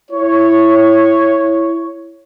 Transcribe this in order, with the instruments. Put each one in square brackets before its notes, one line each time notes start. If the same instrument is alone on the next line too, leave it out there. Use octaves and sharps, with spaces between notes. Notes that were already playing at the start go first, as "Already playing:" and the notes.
[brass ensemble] E4 C#5